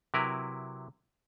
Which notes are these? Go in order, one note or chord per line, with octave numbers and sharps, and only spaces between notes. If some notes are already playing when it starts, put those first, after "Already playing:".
C3 F#3 E4 A#4 B4